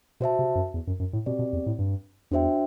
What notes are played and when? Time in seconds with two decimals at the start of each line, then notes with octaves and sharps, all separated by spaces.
0.20 B2 F#4 C5 E5 A5
0.39 C3
0.55 F#2
0.74 E2
0.87 F#2
1.00 F#2
1.13 A2
1.26 B2 C4 G4 D5
1.39 B2
1.53 E2
1.66 A2
1.79 G2
2.31 E2 D4 F#4 C5 E5 G5